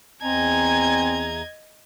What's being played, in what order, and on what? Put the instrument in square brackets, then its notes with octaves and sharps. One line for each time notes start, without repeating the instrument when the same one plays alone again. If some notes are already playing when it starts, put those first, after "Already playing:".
[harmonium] E2 A#5 [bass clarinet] C4 [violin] D#5 G#6 [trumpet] G#5